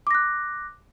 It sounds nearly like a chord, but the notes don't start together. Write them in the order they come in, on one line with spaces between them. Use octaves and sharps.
D6 A#6 F#6